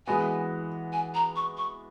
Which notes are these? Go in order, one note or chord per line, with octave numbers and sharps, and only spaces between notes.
E3 G#3 B3 F#4 G#5
G#5
A#5
C#6
C#6